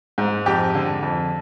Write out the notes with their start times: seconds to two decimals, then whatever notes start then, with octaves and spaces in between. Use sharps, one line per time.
0.18 G#2
0.46 F2 G4
0.75 D3
1.03 F2